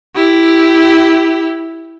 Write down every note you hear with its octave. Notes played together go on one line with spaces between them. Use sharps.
E4 G4